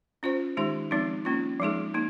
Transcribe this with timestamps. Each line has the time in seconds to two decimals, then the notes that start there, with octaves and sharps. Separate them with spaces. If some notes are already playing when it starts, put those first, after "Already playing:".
0.23 C#4 F4 C5
0.57 D#3 G#3 D#4 G4
0.91 F3 G#3 C4 D#4
1.25 A#3 C#4 F4
1.60 F3 G#3 D#4 G#4
1.94 A#3 D#4